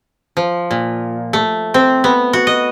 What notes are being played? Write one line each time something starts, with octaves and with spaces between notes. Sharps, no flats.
F3
A#2
A3
C4
B3
F#4
D#5